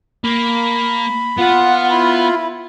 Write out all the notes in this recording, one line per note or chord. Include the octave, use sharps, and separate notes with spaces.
A#3 B5
B3 F4 B4 F#5
E4 B5